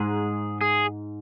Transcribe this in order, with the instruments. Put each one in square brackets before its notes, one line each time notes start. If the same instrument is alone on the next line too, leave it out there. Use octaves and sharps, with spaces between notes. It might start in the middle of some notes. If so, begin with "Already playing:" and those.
Already playing: [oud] G#2 [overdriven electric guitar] G#4
[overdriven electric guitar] G#4